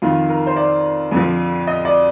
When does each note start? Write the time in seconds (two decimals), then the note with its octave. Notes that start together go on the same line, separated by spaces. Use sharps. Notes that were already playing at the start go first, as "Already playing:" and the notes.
0.02 F2 D#3 F4
0.29 A#4
0.47 C5
0.56 D5
1.12 F2 D3 F3
1.67 D#5
1.85 D5